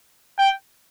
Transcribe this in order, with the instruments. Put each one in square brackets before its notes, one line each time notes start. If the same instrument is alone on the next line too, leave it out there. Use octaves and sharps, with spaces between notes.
[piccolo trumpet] G5